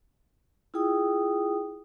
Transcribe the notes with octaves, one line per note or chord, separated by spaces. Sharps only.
E4 F4 G#4 G5 D#6